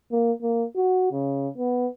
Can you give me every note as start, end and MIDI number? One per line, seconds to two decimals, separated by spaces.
0.12 0.32 58
0.42 0.64 58
0.76 1.07 66
1.12 1.48 49
1.58 1.87 59